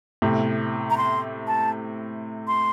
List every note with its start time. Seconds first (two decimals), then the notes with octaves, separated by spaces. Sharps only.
0.22 A2 C3
0.90 A#5
0.97 C6
1.47 A5
2.47 C6